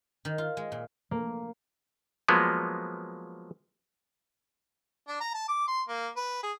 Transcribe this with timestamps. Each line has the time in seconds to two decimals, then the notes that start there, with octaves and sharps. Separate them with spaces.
0.25 D#3
0.38 F4
0.57 G#3
0.72 A#2
1.11 A#3
2.28 F3 F#3 G#3 A#3 B3
5.08 D4
5.20 A#5
5.34 A5
5.48 D6
5.68 C6
5.89 A#3
6.17 B4
6.43 G#4